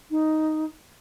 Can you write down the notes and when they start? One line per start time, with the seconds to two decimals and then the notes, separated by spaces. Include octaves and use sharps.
0.11 D#4